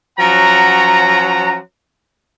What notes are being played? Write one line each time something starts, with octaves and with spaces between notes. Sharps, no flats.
F3 F#3 C#4 F#5 A#5